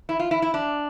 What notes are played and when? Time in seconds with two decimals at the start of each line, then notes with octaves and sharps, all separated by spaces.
0.09 E4
0.19 F4
0.31 E4
0.42 E4
0.54 D4